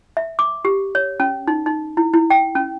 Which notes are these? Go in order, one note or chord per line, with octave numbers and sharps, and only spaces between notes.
E5
D6
G4
C#5
C#4
D#4
D#4
E4
E4
G5
C#4